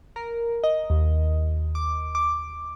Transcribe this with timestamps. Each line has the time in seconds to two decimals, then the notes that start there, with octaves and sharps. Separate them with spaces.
0.16 A#4
0.64 D#5
0.90 D#2
1.75 D6
2.15 D6